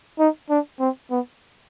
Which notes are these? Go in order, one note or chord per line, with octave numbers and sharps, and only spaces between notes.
D#4
D4
C4
B3